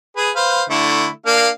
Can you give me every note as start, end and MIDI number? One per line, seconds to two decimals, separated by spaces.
0.16 0.30 68
0.16 0.30 71
0.36 0.63 71
0.36 0.63 72
0.36 0.63 77
0.70 1.08 50
0.70 1.08 57
0.70 1.08 64
1.26 1.48 58
1.26 1.48 62
1.26 1.48 77